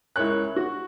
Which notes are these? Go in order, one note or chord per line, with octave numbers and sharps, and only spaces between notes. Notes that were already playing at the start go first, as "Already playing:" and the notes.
C#2 E4 A#4 C#5 F#6
F#4